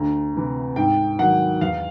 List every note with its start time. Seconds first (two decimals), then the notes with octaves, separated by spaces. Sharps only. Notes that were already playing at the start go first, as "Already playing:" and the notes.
Already playing: D2 A#5
0.34 C3 E3
0.76 G#2 G5
1.19 D#3 F#3 F#5
1.61 E2 F5